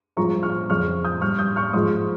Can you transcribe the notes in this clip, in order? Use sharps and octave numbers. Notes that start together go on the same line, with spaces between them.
G2 F3 G#3 A#5 C#6
C#6 F6
F2 C#3 G#3 C#6 F6
D#6 G6
G2 G3 C#6 F6
D#6 G6
C#6 F6
G#2 F3 G#3 C6 D#6